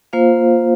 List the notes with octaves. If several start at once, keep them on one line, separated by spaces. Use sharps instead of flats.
A#3 F4 C5 F5